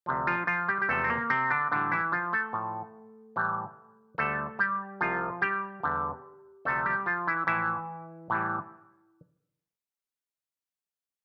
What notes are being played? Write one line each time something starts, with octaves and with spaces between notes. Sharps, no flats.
D2 C3 F3
F3 F4
F3 F4
G3 G4
G4
E2 C3 F3 A3 A4
C4
A#3
C3 C4
D3 D4
A2 D3 E3 G3 D4
E3 E4
F3 F4
A3 A4
A2 F3
A2 E3 G3
D2 D3 G3 A3 A4
G3 G4
C2 C3 F3 F4
G3 G4
E2 D3 G3
D2 C3 F3 A3 A4
G3 G4
F3 F4
E3 E4
A2 E3 F3 E4
A2 E3 G3